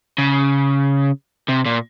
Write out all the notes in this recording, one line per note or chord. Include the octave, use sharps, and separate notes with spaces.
C#3
C3
A#2